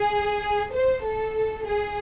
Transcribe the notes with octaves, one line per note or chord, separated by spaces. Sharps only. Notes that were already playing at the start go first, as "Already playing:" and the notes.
Already playing: G#4
C5
A4
G#4